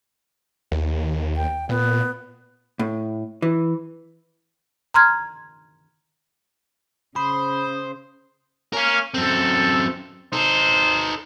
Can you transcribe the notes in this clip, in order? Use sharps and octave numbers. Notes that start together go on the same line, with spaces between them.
D#2
G5
A#2 B3
A2
E3
A#5 C6 F6 G#6
C#3 C5 B5 D#6
C#4 A#4 F5
F#2 C4 A4
D#4 A4 C5